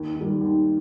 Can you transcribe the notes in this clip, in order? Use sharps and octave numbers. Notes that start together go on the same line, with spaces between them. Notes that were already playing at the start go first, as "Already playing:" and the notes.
Already playing: D#2
D#3
G3
D#2